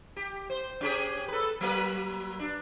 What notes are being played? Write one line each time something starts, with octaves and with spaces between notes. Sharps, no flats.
G4
C5
C#4 G4 G#4
A4 B4
F#3 A#3 B4
D4